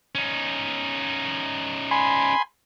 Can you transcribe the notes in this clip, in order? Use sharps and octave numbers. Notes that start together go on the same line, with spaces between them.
C#4 D#4
G#5 B5 C6